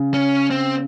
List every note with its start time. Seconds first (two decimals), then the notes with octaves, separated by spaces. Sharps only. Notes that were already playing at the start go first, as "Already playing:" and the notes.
Already playing: C#3
0.14 C#4
0.50 C4